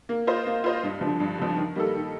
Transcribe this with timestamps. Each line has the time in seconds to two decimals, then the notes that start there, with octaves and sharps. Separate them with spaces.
0.09 A#3
0.27 F4 C5 D#5
0.47 A#3
0.64 F4 C5 D#5
0.83 G2
1.01 D3 F3
1.20 G2
1.38 D3 F3
1.56 D#3
1.75 G3 A#3 D#4 A4
1.94 D#3